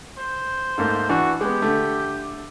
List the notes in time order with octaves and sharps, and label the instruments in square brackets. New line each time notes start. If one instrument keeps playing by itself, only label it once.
[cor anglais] C5
[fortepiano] G#2 A3 A#3
[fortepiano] E3 D4 [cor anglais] F#4
[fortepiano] G#3 B3 [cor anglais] G4
[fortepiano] D3 A3